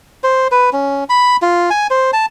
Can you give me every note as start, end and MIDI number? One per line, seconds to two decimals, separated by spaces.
0.24 0.48 72
0.52 0.70 71
0.73 1.04 61
1.09 1.37 83
1.42 1.70 65
1.70 1.87 80
1.90 2.11 72
2.13 2.26 81